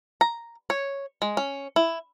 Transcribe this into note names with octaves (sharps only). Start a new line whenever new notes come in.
A#5
C#5
G#3
C#4
E4